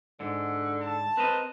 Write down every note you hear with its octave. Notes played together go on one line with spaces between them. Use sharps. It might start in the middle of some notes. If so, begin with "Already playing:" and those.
G#2 D3
A5
C4 A#4 B4 D#5